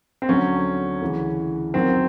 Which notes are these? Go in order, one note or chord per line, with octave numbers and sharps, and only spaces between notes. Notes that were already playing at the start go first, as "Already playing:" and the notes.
C4
D2 D3 F#3 C#4
D2 C#3 E3
F#2 D#3 F#3 C4